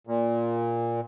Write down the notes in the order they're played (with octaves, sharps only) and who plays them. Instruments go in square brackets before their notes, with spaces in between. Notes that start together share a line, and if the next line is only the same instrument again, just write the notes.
[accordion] A#2